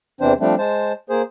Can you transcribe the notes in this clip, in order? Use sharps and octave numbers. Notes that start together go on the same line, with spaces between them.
E2 C3 E3 C4 D4 C5
F3 G3 A3 C4 D4
G#3 C5 A5
A#3 G#4 C5